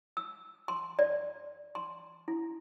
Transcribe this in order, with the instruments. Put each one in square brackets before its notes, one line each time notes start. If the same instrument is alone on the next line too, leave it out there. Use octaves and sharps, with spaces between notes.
[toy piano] E6
C6
D5
C6
E4